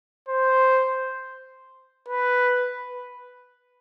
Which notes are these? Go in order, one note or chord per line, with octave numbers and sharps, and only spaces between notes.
C5
B4